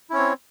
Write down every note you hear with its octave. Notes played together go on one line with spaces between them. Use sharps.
C4 C#4 E4 C#5